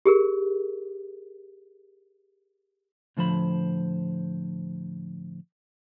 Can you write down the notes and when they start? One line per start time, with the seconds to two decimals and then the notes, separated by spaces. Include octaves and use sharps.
0.06 G4 G#4 A#4
3.17 A2 D3 F3 C5 B5